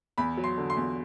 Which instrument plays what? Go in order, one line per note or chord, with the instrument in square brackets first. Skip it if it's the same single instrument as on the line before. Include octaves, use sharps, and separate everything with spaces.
[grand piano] E2 B5
F#3
C6
D3
C6
E2